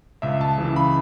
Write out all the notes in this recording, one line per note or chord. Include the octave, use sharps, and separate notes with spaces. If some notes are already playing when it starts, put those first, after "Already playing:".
C#2 E5
A5
C#3 E3
B5